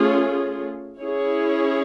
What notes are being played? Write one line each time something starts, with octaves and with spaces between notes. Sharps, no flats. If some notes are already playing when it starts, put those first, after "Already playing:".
Already playing: A3 C#4 F4 G#4
C#4 E4 G#4 C#5